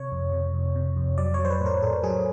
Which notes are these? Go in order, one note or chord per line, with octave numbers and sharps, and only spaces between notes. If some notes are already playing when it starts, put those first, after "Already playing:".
Already playing: C3 C#5
F2
C3
F2
C3
F2
F#3 D5
F#3 C#5
C5
B4
A2
A#4
A2 A4
F#3 G#4